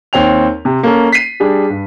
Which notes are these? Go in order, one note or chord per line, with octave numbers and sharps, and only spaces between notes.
D#2 C4 C#5 G5 F7
C3
A#3 C#4 A4
B6 C7 D#7
G3 D4 G#4
G2